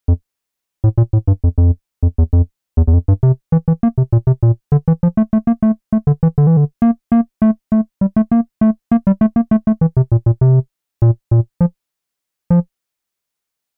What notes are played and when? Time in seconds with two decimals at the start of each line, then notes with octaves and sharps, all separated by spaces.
0.08 F2
0.84 A2
0.98 A#2
1.13 A2
1.28 G2
1.44 F2
1.58 F2
2.03 F2
2.18 E2
2.33 F2
2.77 E2
2.87 E2
2.93 F2
3.08 G2
3.23 C3
3.52 E3
3.68 E3
3.83 A#3
3.98 C3
4.13 A#2
4.27 C3
4.43 A#2
4.72 D3
4.88 E3
5.03 F3
5.17 A3
5.33 A3
5.47 A#3
5.63 A3
5.93 A3
6.07 D3
6.23 E3
6.38 D3
6.47 E3
6.57 D3
6.82 A#3
7.12 A#3
7.42 A3
7.72 A3
8.01 G3
8.16 A3
8.31 A#3
8.61 A3
8.91 A#3
9.07 G3
9.21 A3
9.36 A#3
9.51 A3
9.67 A3
9.81 E3
9.97 C3
10.12 A#2
10.26 A#2
10.41 C3
11.02 A#2
11.31 A#2
11.61 F3
12.50 F3